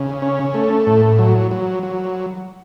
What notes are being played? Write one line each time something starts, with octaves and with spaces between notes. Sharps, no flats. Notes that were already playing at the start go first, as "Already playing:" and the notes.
Already playing: C#3
C#4
A3
A2
F#3
F#3
F#3